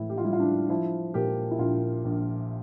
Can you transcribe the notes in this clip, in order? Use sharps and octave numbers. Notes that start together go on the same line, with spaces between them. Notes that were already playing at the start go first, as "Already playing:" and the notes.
Already playing: A2 E3 E4
G4
F4
G3 E4
F4
D4
F3 E4
A#2 G4
E4
A#1 F4
A#1